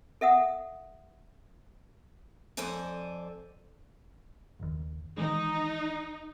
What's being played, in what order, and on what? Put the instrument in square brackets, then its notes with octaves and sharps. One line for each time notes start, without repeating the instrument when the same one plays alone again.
[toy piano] A4 E5 F#5 D#6
[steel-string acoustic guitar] F2 A4 C5 D5 G#5
[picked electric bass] F#1 D#2
[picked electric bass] D#3 E3 G#3 [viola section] D#4